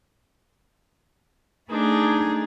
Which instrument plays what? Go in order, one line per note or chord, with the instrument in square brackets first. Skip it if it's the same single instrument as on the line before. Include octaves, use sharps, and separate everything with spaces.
[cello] A3 G#4 [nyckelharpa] D4 D#4